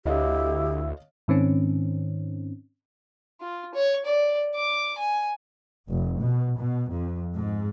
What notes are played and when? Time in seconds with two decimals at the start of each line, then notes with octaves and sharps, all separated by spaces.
0.05 D2 E4 G4 C#5 D#5 F5
1.28 G#2 D#3 C4 C#4
3.41 F4
3.75 C#5
4.06 D5
4.55 D6
4.98 G#5
5.89 F1
6.20 B2
6.59 B2
6.93 F2
7.34 G#2